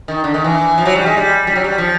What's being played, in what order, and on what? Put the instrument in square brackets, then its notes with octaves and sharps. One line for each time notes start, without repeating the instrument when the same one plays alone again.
[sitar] D#3
D3
D#3
E3
F3
F#3
G3
G#3
G3
G3
F#3
G3
F3